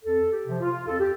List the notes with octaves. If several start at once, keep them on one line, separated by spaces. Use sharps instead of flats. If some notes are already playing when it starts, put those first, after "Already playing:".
F2 A4
G4
C3 F3
F4
F2 A4
G4